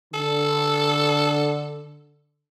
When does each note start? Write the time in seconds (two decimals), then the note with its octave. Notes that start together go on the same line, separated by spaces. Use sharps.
0.14 D3 A4